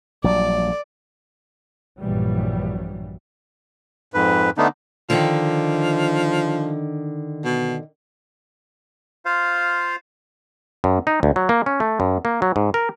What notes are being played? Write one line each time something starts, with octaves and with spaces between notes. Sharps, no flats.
A#1 F#3 G3 D5
A#1 G2 E3 F#3 G3
F2 G#2 B4
D3 A3 B3 D4 D#4
D3 D#3 F3
B2
F4 C5 F5
F#2
D#4
D2
F#3
A#3
C#4
A3
F#2
A#3
F#3
G#2
A#4